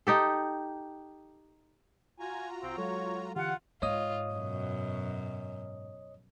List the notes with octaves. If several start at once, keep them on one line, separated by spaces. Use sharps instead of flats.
D#4 G4 A4
F4 F#4 G#5 A#5
C2 C4
F#3 G#3 A4 C#5
D3 E3 F4 G4 F#5
G#2 F4 C#5 D#5 D#6
F#2 B2